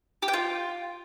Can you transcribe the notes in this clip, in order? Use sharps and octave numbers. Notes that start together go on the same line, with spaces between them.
G4
G5
F4